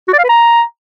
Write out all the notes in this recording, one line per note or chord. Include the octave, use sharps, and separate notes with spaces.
F#4
D5
F5
B4
A#5